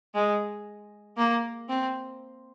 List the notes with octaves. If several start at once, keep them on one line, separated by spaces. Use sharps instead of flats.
G#3
A#3
C4